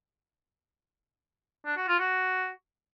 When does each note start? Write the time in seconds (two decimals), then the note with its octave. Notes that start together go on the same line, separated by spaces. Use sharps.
1.66 D4
1.77 F#4
1.88 F4
1.99 F#4